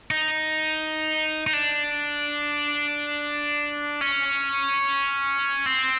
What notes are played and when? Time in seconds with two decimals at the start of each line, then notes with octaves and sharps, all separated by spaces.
0.11 D#4
1.47 D#4
1.53 D4
4.01 C#4
5.66 C4